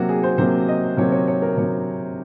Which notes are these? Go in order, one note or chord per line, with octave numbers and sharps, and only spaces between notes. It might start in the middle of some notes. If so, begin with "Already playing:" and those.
Already playing: C3 F#3 A#3 F#4
G#4
C5
C3 F#3 A#3 C5
D#5
C3 F#3 A#3 C#5
C#5
C#5
A#4
C3 F#3 C#5